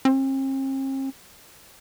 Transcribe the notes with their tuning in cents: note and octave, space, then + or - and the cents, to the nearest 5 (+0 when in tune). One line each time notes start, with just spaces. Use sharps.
C4 +45